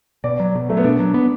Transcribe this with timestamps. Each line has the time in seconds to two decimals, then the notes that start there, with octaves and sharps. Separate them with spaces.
0.24 B2 D5
0.40 F#3
0.55 B2
0.69 F#3 A3
0.77 B3
0.84 B2 D4
0.99 F#3
1.14 B3